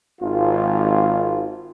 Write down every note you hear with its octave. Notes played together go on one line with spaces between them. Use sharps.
G#1 F4